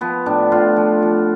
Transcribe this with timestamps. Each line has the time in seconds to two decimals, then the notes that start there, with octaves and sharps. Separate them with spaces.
0.01 F3 B3
0.26 A2 D4
0.52 A2 F4
0.76 F3
1.03 F3